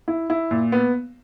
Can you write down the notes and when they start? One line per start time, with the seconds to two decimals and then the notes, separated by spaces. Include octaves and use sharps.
0.08 E4
0.30 E4
0.51 A#2
0.72 B3